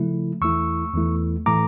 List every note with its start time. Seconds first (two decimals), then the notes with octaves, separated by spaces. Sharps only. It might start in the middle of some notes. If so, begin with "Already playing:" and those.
Already playing: C#3 F3 A3 E4
0.41 E2 E3 A3 E4 C#6 E6
0.94 E2 E3 A3 E4
1.46 A2 E3 A3 A#5 D6